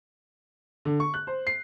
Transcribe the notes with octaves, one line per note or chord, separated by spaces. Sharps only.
D3
C#6
F#6
C5
C7